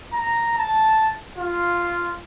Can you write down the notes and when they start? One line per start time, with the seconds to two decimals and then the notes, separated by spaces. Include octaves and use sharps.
0.13 A#5
0.59 A5
1.39 F4